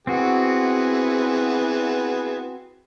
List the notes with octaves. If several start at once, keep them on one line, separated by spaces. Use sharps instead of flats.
E3 B3 C4 F#4 G#4